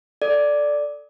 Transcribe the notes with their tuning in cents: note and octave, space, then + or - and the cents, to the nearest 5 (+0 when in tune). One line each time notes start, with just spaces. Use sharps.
A4 +10 D5 +0